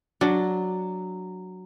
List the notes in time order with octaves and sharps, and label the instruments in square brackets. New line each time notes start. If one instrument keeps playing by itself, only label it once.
[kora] F#3 [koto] D4